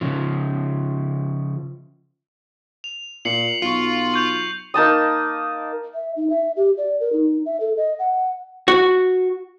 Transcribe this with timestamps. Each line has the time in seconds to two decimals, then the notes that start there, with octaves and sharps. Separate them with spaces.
0.01 C#3 F3
2.84 F7
3.25 A#2 C7 C#7 F#7
3.62 B1 F4 C#6 C7
4.14 C#6 G6 F7
4.74 A#3 D#4 A5 D#6
5.94 E5
6.16 D#4
6.30 E5
6.56 G4
6.78 D5
7.00 A#4
7.13 D#4
7.46 E5
7.60 A4
7.77 D#5
7.99 F#5
8.68 F#4